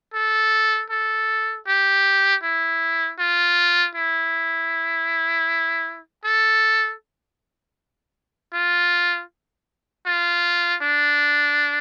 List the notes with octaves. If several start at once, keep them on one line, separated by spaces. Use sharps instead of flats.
A4
A4
G4
E4
F4
E4
A4
F4
F4
D4